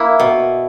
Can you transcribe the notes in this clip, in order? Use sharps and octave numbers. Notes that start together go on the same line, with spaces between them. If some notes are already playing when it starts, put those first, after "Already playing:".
Already playing: A#3 E4
B2